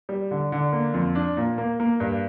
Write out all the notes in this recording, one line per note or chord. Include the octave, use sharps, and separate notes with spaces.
G3
D3
D3
A#3
F2
D4
A#2
A#3
A#3
G2